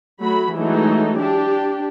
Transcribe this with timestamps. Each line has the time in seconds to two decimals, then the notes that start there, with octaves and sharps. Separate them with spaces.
0.20 F#3 A3 F#4 B5
0.53 E3 F#3 G#3 A3 D#4
1.17 D4 G4